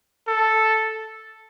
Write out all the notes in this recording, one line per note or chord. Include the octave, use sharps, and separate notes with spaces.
A4